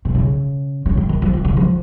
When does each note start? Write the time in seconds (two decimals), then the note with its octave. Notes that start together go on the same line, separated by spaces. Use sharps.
0.05 C3
0.15 C#3
0.86 C#3
0.97 D#3
1.09 D#3
1.22 F3
1.33 D#3
1.45 C#3
1.57 F3